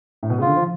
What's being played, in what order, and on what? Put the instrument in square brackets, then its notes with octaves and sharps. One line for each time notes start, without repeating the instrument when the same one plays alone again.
[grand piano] A2
B2
[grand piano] C#3 [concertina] F4
[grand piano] D3
F3